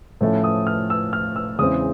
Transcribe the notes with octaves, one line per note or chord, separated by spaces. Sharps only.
A2 F3 A3 C#4
D#6
F6
E6
F6
E6
E2 C#3 E3 G#3 C4 D#6